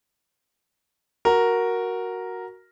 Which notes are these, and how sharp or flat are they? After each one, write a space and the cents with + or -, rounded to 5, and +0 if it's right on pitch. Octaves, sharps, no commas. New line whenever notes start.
F#4 +0 A#4 +0